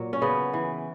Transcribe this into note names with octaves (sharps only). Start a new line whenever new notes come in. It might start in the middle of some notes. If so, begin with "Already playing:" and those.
Already playing: A#2 F#3
C#4
C#3 B3
E3